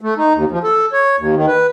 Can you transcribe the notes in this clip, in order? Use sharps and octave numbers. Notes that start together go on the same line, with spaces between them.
A3
D#4
D#2
F3
A4
C#5
D#2
D#3
B4